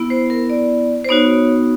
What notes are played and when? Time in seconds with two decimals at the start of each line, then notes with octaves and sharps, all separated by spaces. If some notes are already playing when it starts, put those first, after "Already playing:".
Already playing: B3 E4
0.10 C5
0.30 A#4
0.50 D5
1.05 C5
1.09 B3 D#4 F#4 C#5